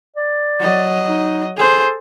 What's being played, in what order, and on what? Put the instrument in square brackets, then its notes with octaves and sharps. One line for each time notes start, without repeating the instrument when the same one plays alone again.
[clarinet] D5
[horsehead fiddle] F#3 D#5
[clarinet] D#4
[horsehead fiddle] G#4 C5 [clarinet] A4